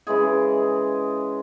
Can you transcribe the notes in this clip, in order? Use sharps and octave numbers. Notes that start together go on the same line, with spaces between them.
C#3 E3 G#3 G#4